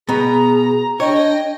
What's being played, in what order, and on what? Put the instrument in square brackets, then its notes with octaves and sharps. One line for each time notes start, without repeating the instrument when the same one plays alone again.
[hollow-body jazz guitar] B2 B3 [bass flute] G#4 [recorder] A#5
[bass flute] D4 [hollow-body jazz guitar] C#5 [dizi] D#5 [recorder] G5